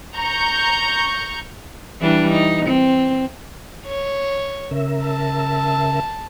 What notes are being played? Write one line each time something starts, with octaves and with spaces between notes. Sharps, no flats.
A#5 C#6 G6 C#7
E3 G3 D4
D#4
C4
C#5
C#3 A#4 E5
A5